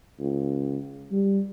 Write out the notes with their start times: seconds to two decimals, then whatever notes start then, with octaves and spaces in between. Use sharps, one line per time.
0.19 C#2
1.12 G3